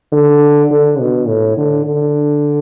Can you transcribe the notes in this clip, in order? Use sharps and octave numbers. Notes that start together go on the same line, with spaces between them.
D3
D3
B2
A2
D3
D3